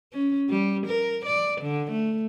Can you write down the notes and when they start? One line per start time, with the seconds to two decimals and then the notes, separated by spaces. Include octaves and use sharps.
0.13 C#4
0.50 G3
0.87 A#4
1.26 D5
1.62 D3
1.91 A3